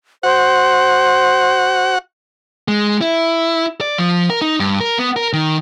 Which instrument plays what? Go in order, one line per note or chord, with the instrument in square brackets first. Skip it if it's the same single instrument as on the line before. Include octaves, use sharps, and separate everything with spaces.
[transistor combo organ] F#4 F#5 [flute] C5
[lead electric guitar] G#3
E4
D5
F3
A#4
D#4
G2
A#4
B3
A#4
D#3